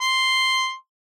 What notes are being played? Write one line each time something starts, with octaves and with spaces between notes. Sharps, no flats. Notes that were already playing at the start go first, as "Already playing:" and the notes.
C6